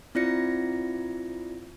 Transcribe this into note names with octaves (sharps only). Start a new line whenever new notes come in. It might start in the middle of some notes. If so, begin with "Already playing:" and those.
C4 E4 F4 D5 A#6 C#7